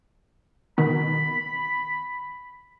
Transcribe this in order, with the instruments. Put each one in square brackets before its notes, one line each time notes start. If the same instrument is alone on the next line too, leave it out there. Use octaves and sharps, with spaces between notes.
[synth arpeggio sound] B2 D#3 [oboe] B5